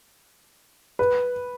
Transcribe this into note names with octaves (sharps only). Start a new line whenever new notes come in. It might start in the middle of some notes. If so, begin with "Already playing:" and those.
B4